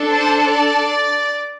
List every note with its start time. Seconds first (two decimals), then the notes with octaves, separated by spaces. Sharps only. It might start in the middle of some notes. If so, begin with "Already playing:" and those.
Already playing: D4 A4
0.09 C5
0.49 D5